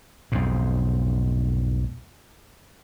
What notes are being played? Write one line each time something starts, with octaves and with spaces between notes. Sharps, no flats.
B1 F2 G#2